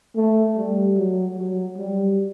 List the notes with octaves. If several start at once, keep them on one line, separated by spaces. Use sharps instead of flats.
A3
G3
F#3
F#3
G3